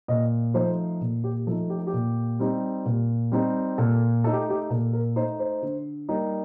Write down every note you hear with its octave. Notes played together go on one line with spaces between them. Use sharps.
A#2 D#5
F3 A3 D#4 C5
A#2
G4
F3 A3 D#4 A4
G4
A4
G4
A#2
G3 C4 D#4
A#2
G3 C4 D#4
A#2 A4
A3 D#4 A4
G4
G4
A#2 A4
A#4
A3 D#4 C5
C5
D3
G3 A#3 D#4